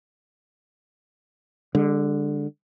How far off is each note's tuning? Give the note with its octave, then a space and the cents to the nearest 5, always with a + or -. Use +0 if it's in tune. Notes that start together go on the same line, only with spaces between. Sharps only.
D3 +0 G#3 -45